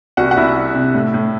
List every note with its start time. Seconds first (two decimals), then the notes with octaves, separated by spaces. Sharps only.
0.17 C2 F#4 F#5
0.31 F#5
0.36 C2 E4 E5
0.56 G3
0.75 C3
0.94 A2
1.14 A2